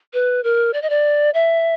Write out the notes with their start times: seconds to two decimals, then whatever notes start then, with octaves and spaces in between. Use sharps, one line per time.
0.14 B4
0.44 A#4
0.74 D5
0.82 D#5
0.90 D5
1.34 E5